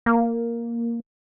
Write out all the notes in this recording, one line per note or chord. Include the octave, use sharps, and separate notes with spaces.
A#3